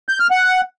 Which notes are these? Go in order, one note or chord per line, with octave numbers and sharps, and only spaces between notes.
G6
F6
F#5